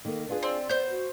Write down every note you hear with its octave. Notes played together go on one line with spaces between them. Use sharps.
D#3 A#3 A4
D4 F4 G#4 B4
C4 D5
B3 C5 G6
F#4